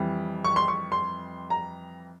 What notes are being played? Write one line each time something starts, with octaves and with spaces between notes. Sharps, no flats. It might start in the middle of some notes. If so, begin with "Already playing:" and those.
Already playing: F2 E3 G3
C#6
C6
C#6
C6
A#5